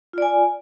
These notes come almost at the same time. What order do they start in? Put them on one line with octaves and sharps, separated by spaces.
F4 D5 G#5